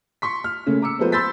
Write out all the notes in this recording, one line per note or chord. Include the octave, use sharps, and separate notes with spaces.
C6 C#6 B6
F6
C#3 A3 A#3 C#4
A#5 D6 E6 C#7
F3 G#3 B3 A4 B4 C5
B5 C6 E6 G6 A6 B6